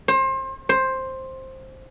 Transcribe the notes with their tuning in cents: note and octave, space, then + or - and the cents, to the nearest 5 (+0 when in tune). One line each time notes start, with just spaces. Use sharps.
C5 +30
C5 +10